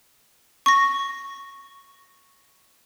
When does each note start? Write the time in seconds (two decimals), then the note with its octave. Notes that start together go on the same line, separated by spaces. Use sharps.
0.66 C#6 A#6